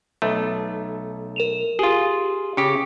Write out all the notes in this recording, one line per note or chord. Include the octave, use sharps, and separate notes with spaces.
B1 A3
A#4 E7 F7
F4 G4 G#4
C#3 G4 C#7